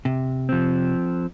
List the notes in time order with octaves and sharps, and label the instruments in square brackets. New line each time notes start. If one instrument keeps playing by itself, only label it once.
[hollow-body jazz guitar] C3
[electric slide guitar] F3 C4